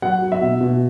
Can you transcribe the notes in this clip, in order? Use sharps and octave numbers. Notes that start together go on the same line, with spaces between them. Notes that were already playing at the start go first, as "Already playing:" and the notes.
F#3 F#5
F#3
E5
B2
B2